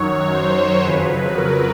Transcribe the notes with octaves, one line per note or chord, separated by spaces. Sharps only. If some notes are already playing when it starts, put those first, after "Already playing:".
Already playing: F#2 D#3 F#3 C#5
C5
F2 C#3 F#3 B4
A#4